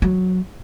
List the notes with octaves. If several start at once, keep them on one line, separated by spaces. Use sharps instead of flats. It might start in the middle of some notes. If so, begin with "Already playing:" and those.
F#3